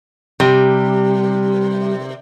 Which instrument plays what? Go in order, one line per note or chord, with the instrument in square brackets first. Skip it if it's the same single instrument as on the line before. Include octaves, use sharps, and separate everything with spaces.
[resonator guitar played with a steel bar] C3 [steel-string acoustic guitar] G3